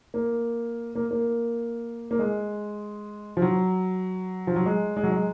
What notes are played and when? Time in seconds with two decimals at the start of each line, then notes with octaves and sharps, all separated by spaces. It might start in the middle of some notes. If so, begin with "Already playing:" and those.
0.14 A#3
0.95 A#3
1.11 A#3
2.11 A#3
2.19 G#3
3.37 F3
3.42 F#3
4.47 F3
4.56 F#3
4.66 G#3
4.97 G#3
5.04 F#3
5.12 G#3